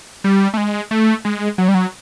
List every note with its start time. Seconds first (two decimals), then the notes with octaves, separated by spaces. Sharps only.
0.24 G3
0.54 A3
0.57 G#3
0.91 A3
1.25 G#3
1.58 F#3
1.68 G3
1.75 F#3